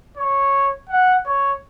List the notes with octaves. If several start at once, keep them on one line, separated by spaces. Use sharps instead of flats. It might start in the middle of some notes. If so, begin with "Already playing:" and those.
C#5
F#5
C#5